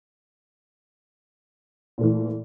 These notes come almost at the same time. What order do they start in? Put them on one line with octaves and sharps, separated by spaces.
A#2 A3 E3